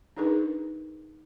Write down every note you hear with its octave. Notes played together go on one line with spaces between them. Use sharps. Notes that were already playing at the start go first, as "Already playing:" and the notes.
D4 D#4 G#4 A#4 B4